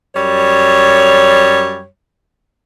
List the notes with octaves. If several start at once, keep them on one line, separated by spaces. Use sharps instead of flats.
F#2 G3 C#5